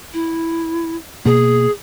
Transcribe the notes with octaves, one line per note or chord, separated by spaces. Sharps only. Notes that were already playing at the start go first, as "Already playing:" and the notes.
E4
B2 A#3 G#4